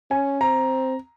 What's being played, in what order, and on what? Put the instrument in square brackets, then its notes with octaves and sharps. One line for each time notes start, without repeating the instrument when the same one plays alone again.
[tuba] C#4 [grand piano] G#5
[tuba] C4 [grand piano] A#5